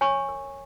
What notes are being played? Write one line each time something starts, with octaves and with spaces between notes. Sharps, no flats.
C#5 G#5 C#6
A#4